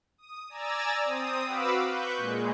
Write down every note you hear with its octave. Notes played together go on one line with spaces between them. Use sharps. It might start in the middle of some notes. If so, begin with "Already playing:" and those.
D#6
D5 G#5 A#5 E6 A6
C4 D#6
F#4 B4 F5 B5 D6 E6
B4 C#6 F#6 G6
A#2 G#3